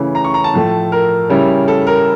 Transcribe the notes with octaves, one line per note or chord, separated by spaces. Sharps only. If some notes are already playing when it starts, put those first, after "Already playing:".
Already playing: C#3 E3 A3 C#4 E4
A#5
C#6
A#5
A5
A2 F3 A3
A#4
C#3 G3 C#4 E4
A4
A#4